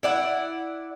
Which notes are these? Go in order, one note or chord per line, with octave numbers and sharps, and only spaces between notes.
E4 D5 F#5